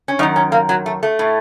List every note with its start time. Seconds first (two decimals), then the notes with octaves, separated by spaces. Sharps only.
0.08 C#4
0.19 F#2 D#4
0.23 D#3
0.36 C#4
0.52 A#3
0.69 F#3
0.86 A3
1.03 A3
1.19 A2